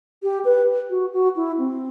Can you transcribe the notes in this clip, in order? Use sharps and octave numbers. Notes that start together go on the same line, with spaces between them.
G4
B4
F#4
F#4
E4
C4